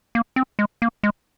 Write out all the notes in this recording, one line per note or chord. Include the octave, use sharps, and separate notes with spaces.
A#3
C4
G#3
A#3
G#3